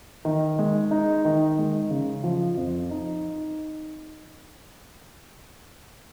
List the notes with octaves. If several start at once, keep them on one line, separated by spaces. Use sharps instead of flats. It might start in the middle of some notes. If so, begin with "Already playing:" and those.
D#3
G#3
D#4
D#3
G#3
C#3
F3
F2
D#4